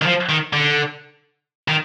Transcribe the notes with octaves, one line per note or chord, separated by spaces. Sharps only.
D#3
F3
D#3
D3
D#3